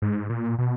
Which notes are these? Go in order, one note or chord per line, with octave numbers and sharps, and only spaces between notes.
G#2
A#2
B2